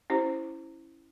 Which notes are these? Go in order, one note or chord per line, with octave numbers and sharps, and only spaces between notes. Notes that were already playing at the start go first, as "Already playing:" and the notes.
C#4 E4 G4 C5